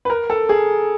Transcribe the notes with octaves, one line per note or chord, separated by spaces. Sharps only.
B4
A#4
A4
G#4